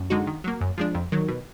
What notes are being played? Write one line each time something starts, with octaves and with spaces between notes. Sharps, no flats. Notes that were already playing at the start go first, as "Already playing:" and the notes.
Already playing: F#2
D3 G#3 D#4 F#4
D#3
F#3 A#3
F#2
F3 G#3 D4
F2
D#3 F#3
B2